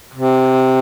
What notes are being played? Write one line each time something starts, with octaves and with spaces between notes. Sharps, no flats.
C3